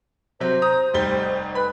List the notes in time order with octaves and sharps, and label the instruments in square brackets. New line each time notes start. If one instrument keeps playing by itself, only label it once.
[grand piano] C3 F#3 [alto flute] C5
[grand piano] A#5 D#6
F1 G3 G7
[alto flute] B4 [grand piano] B5